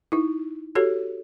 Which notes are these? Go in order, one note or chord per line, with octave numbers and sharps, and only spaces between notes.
D#4 E4
F#4 G4 A4 C#5